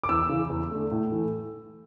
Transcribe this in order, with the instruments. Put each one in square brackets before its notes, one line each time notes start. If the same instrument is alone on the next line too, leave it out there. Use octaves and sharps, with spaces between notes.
[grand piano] D6
E2 E6
C#3 E3
E2
D3 A3
A2
E3 A3